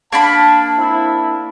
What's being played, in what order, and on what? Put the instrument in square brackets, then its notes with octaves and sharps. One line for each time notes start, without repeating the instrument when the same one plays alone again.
[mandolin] A#3 D4 B5 [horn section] A5
[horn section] C4 E4